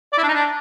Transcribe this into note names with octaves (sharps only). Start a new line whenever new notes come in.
D5
E4
D4
D#4
D4